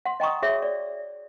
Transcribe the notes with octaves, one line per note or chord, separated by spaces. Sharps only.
F#5 C6
D#5 G5 A#5 C#6 D#6
F#4 G#4 C#5 E5
D5